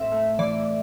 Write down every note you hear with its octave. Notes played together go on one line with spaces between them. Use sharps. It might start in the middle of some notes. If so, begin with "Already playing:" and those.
Already playing: A2 C4 E5
A3
E3 D5